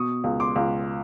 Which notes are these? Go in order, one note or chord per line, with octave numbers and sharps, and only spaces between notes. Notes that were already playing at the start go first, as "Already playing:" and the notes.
Already playing: B2 C#6 D#6
C#2
C6 D6
C#2